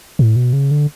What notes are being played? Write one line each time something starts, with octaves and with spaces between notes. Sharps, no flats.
A2
B2
C#3
D3